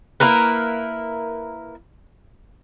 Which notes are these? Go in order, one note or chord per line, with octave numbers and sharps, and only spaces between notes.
A#3 E4 A#4 B4